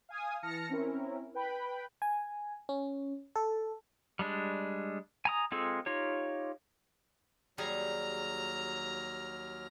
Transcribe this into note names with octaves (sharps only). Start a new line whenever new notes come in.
F5 G#5 D#6
E3 A5 F6 A#6 C#7
C4 C#4 E4 A#4
B4 G5 B5
G#5
C#4
A4
G3 G#3 D4
G#5 A#5 D#6
G#3 C4 F4 G#4 A4
D#4 F4 G4 C#5
D#2 F#3 G3 G#4 A#5 F6